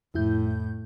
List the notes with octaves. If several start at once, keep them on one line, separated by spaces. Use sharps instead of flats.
F2 A2 E4 G6